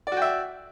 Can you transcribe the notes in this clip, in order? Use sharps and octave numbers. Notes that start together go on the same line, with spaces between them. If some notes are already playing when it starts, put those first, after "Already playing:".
F#4 D5 E5 G5